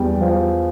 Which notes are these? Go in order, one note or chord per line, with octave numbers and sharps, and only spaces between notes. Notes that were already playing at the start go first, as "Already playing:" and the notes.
Already playing: E2 G3 G5
F3